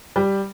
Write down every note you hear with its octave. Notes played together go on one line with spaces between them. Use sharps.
G3